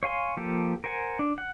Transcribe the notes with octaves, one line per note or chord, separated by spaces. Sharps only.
C#5 F5 G#5 C6
F3 A#3 G4 A4
A#4 C5 F#5 G#5
D4
F#5